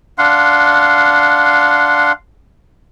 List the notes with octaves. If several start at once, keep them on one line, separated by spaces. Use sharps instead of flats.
D4 F5 F#5 C6